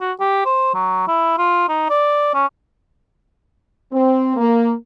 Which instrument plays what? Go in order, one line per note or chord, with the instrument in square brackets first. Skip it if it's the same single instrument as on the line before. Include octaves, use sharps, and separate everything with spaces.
[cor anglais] F#4
G4
C5
F#3
E4
F4
D#4
D5
C#4
[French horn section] C4
A#3